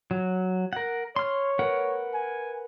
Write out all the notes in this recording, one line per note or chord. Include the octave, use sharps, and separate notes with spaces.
F#3
A#4 F#5
C#5 C6 F6
A#4 B4 F#5
G#5